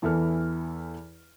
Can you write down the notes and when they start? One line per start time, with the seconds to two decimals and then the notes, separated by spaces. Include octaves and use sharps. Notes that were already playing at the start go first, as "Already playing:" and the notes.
0.02 E2 E3 E4 A4 F6